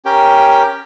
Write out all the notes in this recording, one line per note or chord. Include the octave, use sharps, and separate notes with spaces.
C#4 G4 A#4 G5